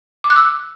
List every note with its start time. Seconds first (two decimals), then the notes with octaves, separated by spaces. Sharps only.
0.24 D6
0.30 F#6
0.36 E6